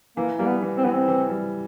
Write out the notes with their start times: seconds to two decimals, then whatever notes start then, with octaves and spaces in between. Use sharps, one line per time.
0.17 E3 A#3
0.38 G3 A#3
0.46 B3
0.62 E3
0.77 C4
0.85 E3 B3
0.93 C4
1.08 E3
1.30 G3